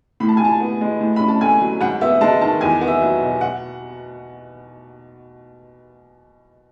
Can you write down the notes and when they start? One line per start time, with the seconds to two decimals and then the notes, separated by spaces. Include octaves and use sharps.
0.20 A2 B5
0.28 A5
0.37 G#5
0.40 A2 A5
0.60 B3
0.81 G#3
1.01 A2
1.16 C#4 B5
1.28 A5
1.41 A3 G#5
1.61 F#3
1.81 G#2 F#5
2.01 B3 E5
2.21 G#3 A5
2.41 D#3 A5
2.61 E2 G#5
2.81 B3
2.87 E5
3.02 F#3
3.21 B2
3.41 F#5